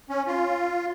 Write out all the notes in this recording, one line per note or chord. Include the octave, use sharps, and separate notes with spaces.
C#4
F4